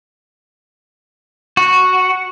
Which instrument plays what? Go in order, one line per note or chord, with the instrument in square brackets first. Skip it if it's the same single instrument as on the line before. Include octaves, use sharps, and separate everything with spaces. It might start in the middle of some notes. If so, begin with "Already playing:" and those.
[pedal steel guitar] F#4